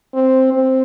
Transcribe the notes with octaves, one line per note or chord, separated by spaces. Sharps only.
C4
C4